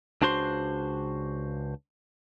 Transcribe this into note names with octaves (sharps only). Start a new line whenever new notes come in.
C#2 D4 F#4 C5 C6